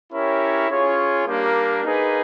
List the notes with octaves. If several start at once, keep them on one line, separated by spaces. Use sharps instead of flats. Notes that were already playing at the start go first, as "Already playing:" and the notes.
C#4 E4 G4 A#4 C#5
C#4 F4 G#4 C#5
G3 A#3 D4 G4 A#4
A#3 D#4 G#4 B4